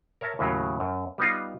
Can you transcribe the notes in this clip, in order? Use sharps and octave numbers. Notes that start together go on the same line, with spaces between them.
A#4 C#5 E5 A5 A#5
D#2 A2 C#3 F#3
F#2
G3 B3 D#4 F4